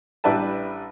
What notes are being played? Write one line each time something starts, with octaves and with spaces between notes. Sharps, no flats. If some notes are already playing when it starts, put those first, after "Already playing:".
A1 G3 D4 B4 E5 A5